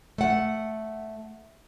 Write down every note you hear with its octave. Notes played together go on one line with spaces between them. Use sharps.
A3 F#5